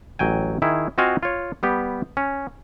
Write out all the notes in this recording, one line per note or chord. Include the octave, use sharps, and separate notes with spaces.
A1 F#3 G5 G#5
D#3 E4 G#4
C4 F4 F#4 D#5 F5 G#5
F4 C#5
G3 B3 G4
C#4